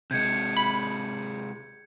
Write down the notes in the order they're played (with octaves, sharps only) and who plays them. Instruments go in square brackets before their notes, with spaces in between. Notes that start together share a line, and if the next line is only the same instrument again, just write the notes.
[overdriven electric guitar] C3 G#3 [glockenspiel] G6 G#6 C#7
[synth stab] B5